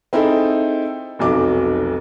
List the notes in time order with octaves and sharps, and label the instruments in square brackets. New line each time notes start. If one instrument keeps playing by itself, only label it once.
[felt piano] C4 D#4 E4 G#4 A4
F1 B1 F#3 D6